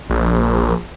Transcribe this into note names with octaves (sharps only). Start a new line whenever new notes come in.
A#1